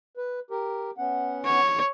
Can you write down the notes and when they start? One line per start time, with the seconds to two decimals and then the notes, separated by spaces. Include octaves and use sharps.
0.17 B4
0.51 G4 A#4
0.98 B3 C#4 F#5
1.45 C#5